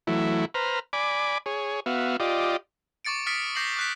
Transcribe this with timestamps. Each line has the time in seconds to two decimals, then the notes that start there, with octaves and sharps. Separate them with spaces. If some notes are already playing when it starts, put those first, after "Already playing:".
0.07 E3 F#3 A3 E4
0.54 B4 C5 A#5 F6
0.93 D5 G#5 B5 D6
1.46 G#4 C#5
1.86 B3 F#4 E5 F5
2.20 F4 G4 D5 D#5
3.05 C#6 D6 A6 C#7 D7
3.26 D#6 F6 A6 B6 C#7 D7
3.55 D6 G6 A#6 C7 F#7
3.77 D6 F#6 B6